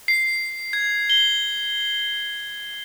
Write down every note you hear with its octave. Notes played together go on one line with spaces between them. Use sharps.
C7
G#6
G7